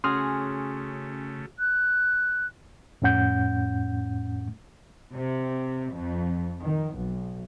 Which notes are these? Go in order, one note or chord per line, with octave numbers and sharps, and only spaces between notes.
C#3 A3 C#4 F#4 G#4 C6 D#6 F6
F#6
F2 A2 C#4 F#5 G6
C3
F2
D#3
B1